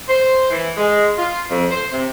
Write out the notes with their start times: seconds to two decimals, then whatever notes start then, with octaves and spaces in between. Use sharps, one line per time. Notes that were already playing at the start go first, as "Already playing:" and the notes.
0.08 C5
0.51 E3
0.78 G#3
1.18 F4
1.50 F2
1.71 C5
1.92 C3